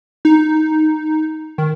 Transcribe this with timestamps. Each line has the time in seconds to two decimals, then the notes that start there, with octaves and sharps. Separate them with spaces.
0.25 D#4
1.58 D#3